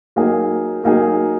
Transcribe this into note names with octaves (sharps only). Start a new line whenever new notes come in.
F#3 A#3 D#4 G#4
F#3 A#3 D#4 G#4